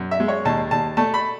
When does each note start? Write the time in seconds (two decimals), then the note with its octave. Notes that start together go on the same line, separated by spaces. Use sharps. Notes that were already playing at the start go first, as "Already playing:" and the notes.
Already playing: F#2
0.11 E5
0.20 G#3
0.28 C#5
0.45 D#2 A5
0.71 D#2 A5
0.97 A3 A5
1.14 B5